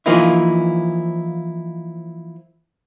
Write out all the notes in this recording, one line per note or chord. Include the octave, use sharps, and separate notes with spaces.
E3 F3 A#3 D#4 E4